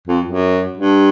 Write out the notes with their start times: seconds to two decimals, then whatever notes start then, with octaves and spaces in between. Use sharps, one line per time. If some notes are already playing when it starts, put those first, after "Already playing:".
0.07 F2
0.25 F#2
0.77 G2